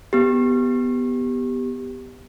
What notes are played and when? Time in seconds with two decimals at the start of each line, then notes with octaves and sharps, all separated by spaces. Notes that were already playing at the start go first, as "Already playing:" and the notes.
0.13 B3 G4